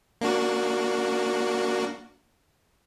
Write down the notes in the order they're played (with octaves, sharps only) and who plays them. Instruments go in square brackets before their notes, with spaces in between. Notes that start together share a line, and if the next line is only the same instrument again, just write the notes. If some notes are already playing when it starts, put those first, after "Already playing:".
[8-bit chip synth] A#3 D4 F#4